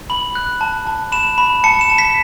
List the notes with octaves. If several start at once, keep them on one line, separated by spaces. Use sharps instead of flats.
B5 F#7
F#6
A5
A5
B5 E7
B5
A5 C#7
E7
A5
B6